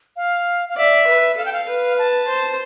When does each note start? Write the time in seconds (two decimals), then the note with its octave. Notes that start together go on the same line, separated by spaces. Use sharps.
0.16 F5
0.69 F5
0.77 D5 E5
1.07 B4
1.37 A4 F5
1.45 G5
1.53 F5
1.68 B4
1.99 A5
2.28 C5